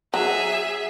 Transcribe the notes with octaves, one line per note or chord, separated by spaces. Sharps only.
F#3 G#4 E5